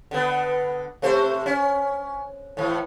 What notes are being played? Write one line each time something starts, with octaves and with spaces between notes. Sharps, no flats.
D3 B3
C3 A3 C5
C#4
A2 E3